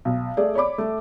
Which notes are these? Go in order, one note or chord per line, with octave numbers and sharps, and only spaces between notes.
B1
A3 G#4 D5
C#5 D5 B5 D6
A3